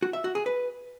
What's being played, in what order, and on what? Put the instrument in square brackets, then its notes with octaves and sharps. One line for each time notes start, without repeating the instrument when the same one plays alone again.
[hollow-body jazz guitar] F#4
E5
F#4
G#4
B4